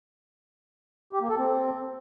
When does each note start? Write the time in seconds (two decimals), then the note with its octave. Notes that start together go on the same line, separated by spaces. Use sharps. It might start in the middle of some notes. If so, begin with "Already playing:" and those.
1.13 G4
1.21 A#3
1.29 A4
1.38 C4